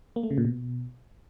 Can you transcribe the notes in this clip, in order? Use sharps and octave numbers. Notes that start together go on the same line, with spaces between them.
A#3
A3
C#3
A#2
B2